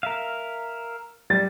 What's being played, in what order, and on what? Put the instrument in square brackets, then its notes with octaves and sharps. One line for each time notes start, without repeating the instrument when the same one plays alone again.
[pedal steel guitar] A#4 E5 F5
[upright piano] G3 A6